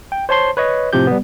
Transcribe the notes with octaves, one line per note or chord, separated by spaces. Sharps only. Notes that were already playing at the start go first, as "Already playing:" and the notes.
G5
C5 C#5 A5 C6
B4 C#5 D#5
A2 C3 F3 C4 G4 G6
G3 B3